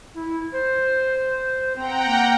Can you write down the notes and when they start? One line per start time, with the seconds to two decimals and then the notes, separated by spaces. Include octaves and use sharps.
0.14 E4
0.52 C5
1.76 C4 F#5 G5 A#5
2.06 A#3